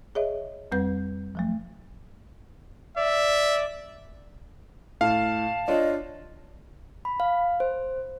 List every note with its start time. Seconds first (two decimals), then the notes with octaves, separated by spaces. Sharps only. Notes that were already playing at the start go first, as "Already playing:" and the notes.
0.15 G#4 C#5 D#5 E5
0.72 F2 G3 C4 B4 G6
1.35 F3 F#3 A3
2.98 D5 E5
5.01 A2 F5 A5
5.68 D4 F4 C#5 D#5
7.05 B5
7.20 F5
7.60 C5